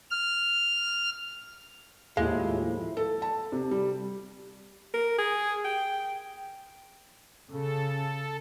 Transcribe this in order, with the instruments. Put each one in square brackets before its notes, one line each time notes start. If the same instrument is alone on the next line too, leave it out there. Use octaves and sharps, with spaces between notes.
[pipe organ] F6
[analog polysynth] D#2 A2 F3 [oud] G#3 [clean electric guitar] A#3 G4 F5 [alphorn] E4
[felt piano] A4
A5
C3
G3
[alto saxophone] A#4
G#4
G5
[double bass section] C#3 [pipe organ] A4